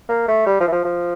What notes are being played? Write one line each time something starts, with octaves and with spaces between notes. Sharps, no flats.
A#3
A3
G3
F3
E3
F3
F3